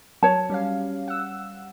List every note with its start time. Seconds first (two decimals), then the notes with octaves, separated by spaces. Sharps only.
0.23 F#3 C#5 A5
0.50 G3 C#4 F5
1.08 F#5 E6